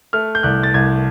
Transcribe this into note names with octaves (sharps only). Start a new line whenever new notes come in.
A3 F6
G6
C2 F#6
A6
C2 G#6